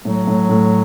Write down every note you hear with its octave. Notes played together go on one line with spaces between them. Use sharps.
A2 F#3
A2
A2